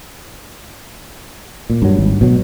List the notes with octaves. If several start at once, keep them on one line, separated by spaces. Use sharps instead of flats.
A#2
G2 F#3
G#1
B2 F#3